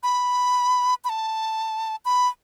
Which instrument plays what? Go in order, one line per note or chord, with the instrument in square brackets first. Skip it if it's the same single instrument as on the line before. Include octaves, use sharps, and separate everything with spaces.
[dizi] B5
B5
A5
B5